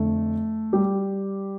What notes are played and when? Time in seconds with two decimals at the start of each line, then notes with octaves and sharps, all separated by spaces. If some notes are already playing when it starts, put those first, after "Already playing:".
Already playing: F2 D3 F3 A3
0.73 G3 G4